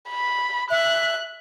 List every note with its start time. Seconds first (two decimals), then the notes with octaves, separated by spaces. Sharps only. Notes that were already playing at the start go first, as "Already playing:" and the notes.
0.10 B5
0.71 E5 F#6